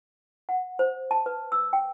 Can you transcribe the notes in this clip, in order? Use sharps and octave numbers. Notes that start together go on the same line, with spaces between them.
F#5
C5
A5
B4
E6
G5